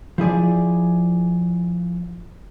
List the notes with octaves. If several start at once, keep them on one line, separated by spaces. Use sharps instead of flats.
F3 E4 G#4 D5